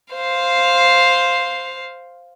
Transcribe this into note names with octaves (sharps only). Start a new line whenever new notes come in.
C5 F5